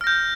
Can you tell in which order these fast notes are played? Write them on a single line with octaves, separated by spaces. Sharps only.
F6 A#6 G6